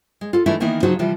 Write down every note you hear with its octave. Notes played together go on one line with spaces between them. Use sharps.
G#3
F4 A4
E3 G#3 A3 D4 E4
D#3 E3 A#3 B3 D#4 E4
C#3 F3 F#3 D#4 F#4 C5
C3 E3 F3 G3